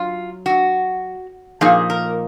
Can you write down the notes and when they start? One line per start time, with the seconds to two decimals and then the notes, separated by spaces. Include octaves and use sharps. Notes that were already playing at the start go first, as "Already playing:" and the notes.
Already playing: F#3 F4
0.46 F#4
1.61 A#2 F3 A#3 D#4 G#4
1.90 A#4